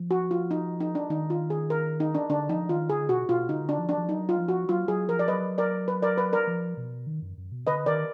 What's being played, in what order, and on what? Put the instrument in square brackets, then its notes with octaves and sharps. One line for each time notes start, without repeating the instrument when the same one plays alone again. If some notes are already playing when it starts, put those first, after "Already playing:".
Already playing: [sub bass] F3
[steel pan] F#4
F4
D#4
D#4
D4
[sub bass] D#3 [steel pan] D#4
[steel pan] F4
G#4
A#4
D#4
D4
[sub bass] D3 [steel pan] D4
[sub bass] F3 [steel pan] D#4
[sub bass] D#3 [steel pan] F4
[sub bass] D3 [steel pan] G#4
[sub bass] B2 [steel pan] F#4
[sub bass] B2 [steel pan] F4
[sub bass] D3 [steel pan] D#4
[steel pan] D4
[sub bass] F3
[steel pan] D4
[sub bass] F3
[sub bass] F#3 [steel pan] D#4
[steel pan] F4
[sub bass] F3
[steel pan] F#4
[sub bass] F#3 [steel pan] F4
[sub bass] F#3 [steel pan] G#4
[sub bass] F3 [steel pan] A#4
[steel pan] D5
[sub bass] F#3 [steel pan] B4 D#5
[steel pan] A#4 D5
B4
A#4 D5
B4
A#4 D5
[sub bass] F3
B2
D#3
F#2
F#2
B2
[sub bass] D3 [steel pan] B4 D#5
[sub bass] D#3 [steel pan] A#4 D5